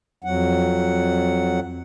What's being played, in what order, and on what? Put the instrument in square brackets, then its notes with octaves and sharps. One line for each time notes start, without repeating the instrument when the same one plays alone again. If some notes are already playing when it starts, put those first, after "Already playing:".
[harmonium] F2 F#3 F#5